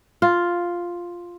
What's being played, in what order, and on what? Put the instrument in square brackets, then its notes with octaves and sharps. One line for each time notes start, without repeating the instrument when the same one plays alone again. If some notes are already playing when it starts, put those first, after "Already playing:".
[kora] F4